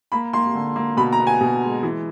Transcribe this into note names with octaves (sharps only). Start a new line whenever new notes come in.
A#3 B5
A#3 C6
D3
A#3
B2 B5
A#5
B3
G#5
B2
G#3
E3